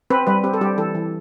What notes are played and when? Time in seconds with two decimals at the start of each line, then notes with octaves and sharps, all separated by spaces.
0.10 C4 B4
0.27 G3 B4
0.44 C4 G4
0.54 A4
0.61 G3 G4
0.78 E3 A4
0.95 E3